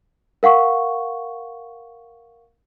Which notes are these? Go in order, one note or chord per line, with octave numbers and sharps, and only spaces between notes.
A#4 F5 F#5 C#6